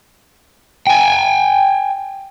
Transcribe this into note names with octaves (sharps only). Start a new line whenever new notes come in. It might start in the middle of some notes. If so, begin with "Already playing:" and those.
G5 G#5